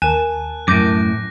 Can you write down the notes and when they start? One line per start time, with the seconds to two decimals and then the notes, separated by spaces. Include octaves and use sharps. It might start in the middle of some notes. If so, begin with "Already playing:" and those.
0.02 D#2 A#4 G#5 A5 F#6 E7
0.68 F#2 A2 D6 G6 A#6